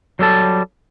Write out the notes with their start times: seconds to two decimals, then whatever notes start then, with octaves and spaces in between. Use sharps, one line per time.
0.19 F#3 G3 A4 A5